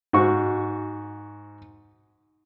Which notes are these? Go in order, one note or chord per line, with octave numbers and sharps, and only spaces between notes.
G#2 F#4 C#6